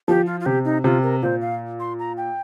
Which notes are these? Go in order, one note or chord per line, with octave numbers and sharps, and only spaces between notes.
F3 G4
F4
F4
C3 G4
D#4
C3 F4
A#4
A#2 C5
F5
C6
A#5
G5